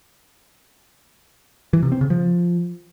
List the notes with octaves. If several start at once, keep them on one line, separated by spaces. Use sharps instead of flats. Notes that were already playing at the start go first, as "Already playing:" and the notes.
E3
C3
C4
C#3
F3